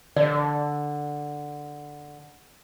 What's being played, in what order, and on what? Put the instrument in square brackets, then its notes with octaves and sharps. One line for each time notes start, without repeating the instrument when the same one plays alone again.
[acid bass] D3 [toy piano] D5